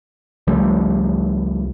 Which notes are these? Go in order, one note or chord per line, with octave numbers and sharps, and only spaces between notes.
C#2 F3 G3 A3